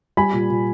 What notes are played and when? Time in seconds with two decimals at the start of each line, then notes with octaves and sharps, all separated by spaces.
0.17 G3 G#5 B5
0.33 A#2
0.50 A#2